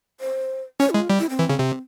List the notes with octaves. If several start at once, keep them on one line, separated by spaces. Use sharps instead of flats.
C5
C#4 C#5
E4
G#3
F4
G3
E4
C4
E3
C#3
C3